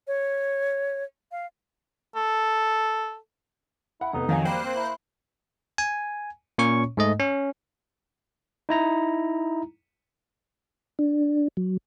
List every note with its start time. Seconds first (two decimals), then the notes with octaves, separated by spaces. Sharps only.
0.07 C#5
1.32 F5
2.15 A4
4.01 E4 F#5
4.13 F1 B3 D#4
4.29 F2 D#3 F#3 F5 G#5
4.45 G3 A#3 C5 G5 F#6
4.64 C4
4.76 E4
5.78 G#5
6.58 A#2 C#4 C#5 C#6
6.97 G#2 A3 D#5
7.20 C#4
8.69 D#4 E4 A#5
10.99 D4
11.57 F#3